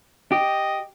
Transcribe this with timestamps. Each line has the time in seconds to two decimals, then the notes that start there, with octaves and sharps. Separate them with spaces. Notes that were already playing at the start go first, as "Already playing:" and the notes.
0.32 G4 D#5